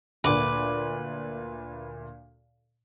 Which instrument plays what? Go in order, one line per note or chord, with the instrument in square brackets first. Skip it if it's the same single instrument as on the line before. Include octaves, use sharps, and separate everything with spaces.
[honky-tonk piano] D2 A#2 [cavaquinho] B4 D6